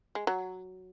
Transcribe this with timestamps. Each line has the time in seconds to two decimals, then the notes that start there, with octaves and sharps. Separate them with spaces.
0.15 G#3
0.27 F#3